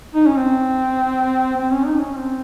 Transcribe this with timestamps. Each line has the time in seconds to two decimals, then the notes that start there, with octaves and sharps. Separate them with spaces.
0.14 D#4
0.26 C#4
0.37 C4
1.57 C4
1.72 C#4
1.86 D#4
2.01 C#4
2.16 C4